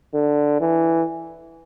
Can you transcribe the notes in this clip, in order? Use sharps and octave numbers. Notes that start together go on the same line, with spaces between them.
D3
E3